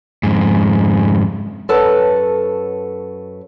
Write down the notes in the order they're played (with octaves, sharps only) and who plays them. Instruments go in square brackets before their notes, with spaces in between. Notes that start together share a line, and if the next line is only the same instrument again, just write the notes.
[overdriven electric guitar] F2 G#2
[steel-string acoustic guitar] F#2 A4 B4 C#5 A5